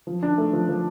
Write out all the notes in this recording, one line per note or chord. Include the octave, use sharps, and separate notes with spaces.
F3
D4
A3
F3
F3